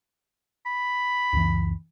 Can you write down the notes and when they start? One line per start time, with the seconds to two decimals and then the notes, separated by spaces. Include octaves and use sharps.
0.66 B5
1.33 C#2 F#2 E3